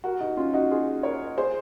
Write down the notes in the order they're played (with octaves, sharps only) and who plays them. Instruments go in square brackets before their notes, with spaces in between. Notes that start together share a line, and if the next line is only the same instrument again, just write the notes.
[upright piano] F#4 A#4
D#4 F#4
C#4 F4
D#4 F#4
F4 G#4
A#4 C#5
G#4 C5